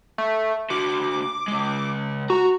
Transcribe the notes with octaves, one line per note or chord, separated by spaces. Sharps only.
A3
D3 F#4 D6
C#3 G#3
F#4 A#5